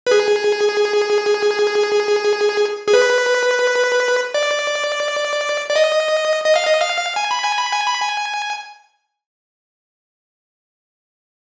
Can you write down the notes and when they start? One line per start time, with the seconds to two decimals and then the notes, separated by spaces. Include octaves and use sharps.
0.07 B4
0.11 G#4
2.88 G#4
2.93 B4
4.34 D5
5.70 D5
5.76 D#5
6.46 D#5
6.56 F5
6.66 D#5
6.81 F5
7.16 G#5
7.31 B5
7.44 G#5
7.58 B5
7.73 G#5
7.86 B5
8.01 G#5